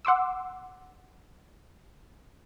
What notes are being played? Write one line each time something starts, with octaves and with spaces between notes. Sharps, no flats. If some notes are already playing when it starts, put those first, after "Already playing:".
F#5 C6 D6 E6